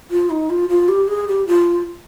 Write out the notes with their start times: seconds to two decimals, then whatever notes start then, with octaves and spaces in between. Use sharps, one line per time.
0.11 F4
0.30 D#4
0.50 F4
0.69 F4
0.89 G4
1.08 G#4
1.28 G4
1.47 F4